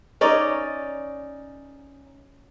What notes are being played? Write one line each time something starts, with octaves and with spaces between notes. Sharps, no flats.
C#4 D#4 D5 D#5